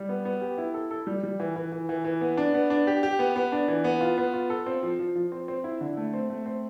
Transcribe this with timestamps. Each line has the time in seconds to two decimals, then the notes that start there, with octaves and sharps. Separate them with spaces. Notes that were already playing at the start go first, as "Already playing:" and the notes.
Already playing: G3
0.09 B3
0.25 B3
0.41 G4
0.58 E4
0.74 A4
0.91 A4
1.07 G3
1.23 G3
1.40 E3
1.56 E3
1.72 E3
1.89 E3
2.05 E3
2.21 B3
2.37 D4
2.54 B3
2.70 D4
2.87 G4
3.03 G4
3.19 B3
3.36 B3
3.52 D4
3.68 E3
3.84 B3
4.01 F4
4.18 B3
4.34 F4
4.50 A4
4.66 C4
4.83 F3
4.99 F3
5.15 F3
5.32 C4
5.48 C4
5.64 E4
5.81 D3
5.97 A3
6.14 C4
6.30 A3
6.46 C4